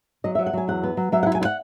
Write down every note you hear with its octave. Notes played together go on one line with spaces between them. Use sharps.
F#3 D#5
F#3 E5
F#5
F#3 G#5
E2 F#5
B3
F#3
F#3 E5
F#5
E4
G#5
E4
F#5